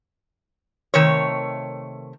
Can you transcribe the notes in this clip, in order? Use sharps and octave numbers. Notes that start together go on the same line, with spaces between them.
C3 D#3 A3 A#4 C#5